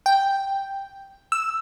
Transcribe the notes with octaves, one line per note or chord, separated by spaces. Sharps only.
G5
E6